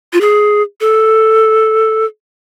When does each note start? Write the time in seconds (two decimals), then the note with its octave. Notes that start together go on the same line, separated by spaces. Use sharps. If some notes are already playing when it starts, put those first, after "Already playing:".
0.13 F4
0.21 G#4
0.81 A4